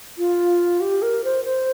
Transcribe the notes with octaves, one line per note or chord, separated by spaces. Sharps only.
F4
G4
A#4
C5
C5